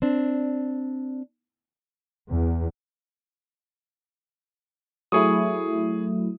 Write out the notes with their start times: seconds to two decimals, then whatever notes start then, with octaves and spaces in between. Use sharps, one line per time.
0.02 C4 D4
2.32 E2
5.12 F#3 A3 E4 G#4 C#6 D#6